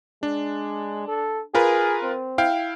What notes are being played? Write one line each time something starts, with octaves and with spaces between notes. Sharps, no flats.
G#3 D4
A4
F4 G#4 A#4 B4
C4
E4 F5 G5